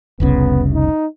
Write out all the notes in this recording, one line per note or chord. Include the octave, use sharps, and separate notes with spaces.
F1 C2 C#3 B3
D#4